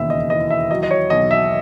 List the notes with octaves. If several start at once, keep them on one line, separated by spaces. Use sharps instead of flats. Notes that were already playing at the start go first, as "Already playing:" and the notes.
Already playing: E1 D#2 C#3 E5
D#5
E3 D#5
E5
F#3 D#5
D#5
C#5
B1 D#5
E5